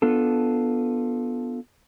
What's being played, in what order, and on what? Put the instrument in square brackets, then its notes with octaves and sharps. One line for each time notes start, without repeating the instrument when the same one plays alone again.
[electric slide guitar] B3 D4 F4 A4